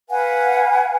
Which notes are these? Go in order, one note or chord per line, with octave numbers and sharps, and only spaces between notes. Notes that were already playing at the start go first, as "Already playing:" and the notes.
B4 F5 F#5 G#5